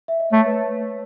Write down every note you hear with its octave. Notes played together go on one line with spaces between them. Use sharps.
E5
D#5
A3 C#5
B4